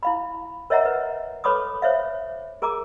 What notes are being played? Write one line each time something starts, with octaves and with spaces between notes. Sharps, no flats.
E4 F5 B5
A#4 C#5 D#5 E5 F#5 A#5
B4
A4 B4 C#5 B5 D6 D#6
C5 C#5 E5 F5
G#4 A#4 A#5 D6